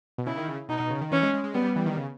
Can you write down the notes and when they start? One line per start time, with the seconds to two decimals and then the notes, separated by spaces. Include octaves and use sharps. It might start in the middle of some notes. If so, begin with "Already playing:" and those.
0.18 B2
0.27 C#3 E4
0.37 D#3
0.48 C#3
0.69 B2 D#4
0.80 B2
0.90 C#3
1.01 D#3
1.12 E3 C#4
1.22 G#3
1.34 G#3
1.44 G#3
1.54 G3 B3
1.76 E3
1.86 D#3
1.97 C#3